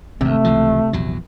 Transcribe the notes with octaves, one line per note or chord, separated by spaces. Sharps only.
G#1 D2 C3 A3
C#2 E3 F3
A#1 E2 F#3